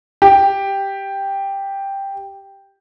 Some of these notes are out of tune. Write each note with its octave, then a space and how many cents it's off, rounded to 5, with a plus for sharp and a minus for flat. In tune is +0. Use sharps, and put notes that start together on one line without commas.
G4 +0